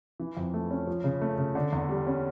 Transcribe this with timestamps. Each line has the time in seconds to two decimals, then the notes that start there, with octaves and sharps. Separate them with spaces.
0.20 E3
0.37 F2
0.54 A3
0.71 C#4
0.87 F3
1.04 C#3
1.22 A3
1.38 C#3
1.55 D3
1.72 E2
1.89 G3
2.07 C#4